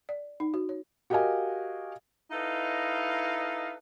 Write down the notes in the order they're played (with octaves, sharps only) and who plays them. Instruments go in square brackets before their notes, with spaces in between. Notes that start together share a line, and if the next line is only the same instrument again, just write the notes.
[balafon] D5
D#4
F#4
C#5
[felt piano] F#4 G4 A#4 D#5 F5 G#5
[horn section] D#4 E4 A4 B4 D#5 F5